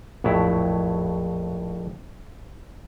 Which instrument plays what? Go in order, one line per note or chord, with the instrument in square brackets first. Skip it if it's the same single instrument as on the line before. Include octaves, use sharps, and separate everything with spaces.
[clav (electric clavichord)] A#1 F2 A2 F#3 E4